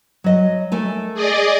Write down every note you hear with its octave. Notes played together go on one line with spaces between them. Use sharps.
F#3 D#5
A3 A#4 G#5
G#4 D5 D#5